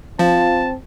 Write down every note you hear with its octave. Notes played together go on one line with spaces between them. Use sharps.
F3 C4 F4 A5